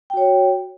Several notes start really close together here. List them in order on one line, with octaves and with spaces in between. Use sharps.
G5 F#4 C#5